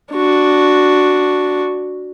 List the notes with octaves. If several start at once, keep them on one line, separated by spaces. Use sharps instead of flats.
D4 F#4